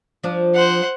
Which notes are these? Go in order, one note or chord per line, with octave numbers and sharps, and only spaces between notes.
F3 D4
C5 F#5